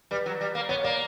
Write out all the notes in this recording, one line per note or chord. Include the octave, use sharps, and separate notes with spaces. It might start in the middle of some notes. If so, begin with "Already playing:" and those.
G3 B4
F#3
G3
A#3
B3 C#5
A#3 D5